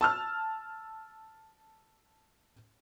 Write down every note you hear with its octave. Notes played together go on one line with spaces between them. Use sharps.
A5 E6 F6